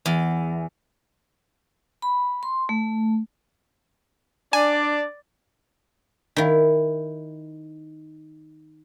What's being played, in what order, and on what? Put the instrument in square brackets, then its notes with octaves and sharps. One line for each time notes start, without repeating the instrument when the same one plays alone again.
[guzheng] E2
[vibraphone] B5
C6
A3
[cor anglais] D4 [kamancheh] D5 [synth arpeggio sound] G#5
[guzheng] D#3 E4